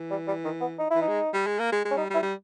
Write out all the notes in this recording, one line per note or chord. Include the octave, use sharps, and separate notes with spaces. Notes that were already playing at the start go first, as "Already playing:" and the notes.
Already playing: E3
G3
G3
D#3
B3
D#4
E3 E4
D#4
G#3
G3
G#3
A#3
G#3
G#3
C#4
G3 D#4
G3
E4
G3